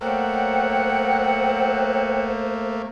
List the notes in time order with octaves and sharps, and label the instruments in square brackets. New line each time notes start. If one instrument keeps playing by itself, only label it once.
[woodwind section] F#3 F#5 [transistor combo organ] A3 A#3 [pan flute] C5 [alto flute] G5